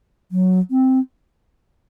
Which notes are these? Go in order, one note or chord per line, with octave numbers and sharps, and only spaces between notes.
F#3
C4